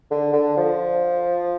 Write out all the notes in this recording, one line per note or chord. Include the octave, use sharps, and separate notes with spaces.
D3
D3
F3